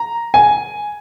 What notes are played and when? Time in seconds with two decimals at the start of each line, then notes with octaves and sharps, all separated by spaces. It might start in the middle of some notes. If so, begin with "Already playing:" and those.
Already playing: A#5
0.34 G#5